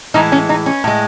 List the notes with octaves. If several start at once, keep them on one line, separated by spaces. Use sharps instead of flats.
A2 E3 G#3 D#4
C#4
D#4
C#4
A2 G#3